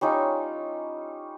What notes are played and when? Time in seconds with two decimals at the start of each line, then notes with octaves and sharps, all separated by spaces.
0.01 G3 C#4 D#4 F4